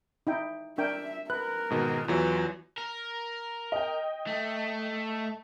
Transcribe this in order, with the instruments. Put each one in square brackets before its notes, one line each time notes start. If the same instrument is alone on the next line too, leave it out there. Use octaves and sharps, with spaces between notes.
[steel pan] D#4 E4 G5
[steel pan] D4 A#4 G5 [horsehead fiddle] E5
[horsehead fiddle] A#4 [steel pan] B4 [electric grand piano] F#6
[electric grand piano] G#2 B2 D#3
[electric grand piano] E2 E3 F#3 [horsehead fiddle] F4
[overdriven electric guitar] A#4
[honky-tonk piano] D#5 G5
[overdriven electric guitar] A3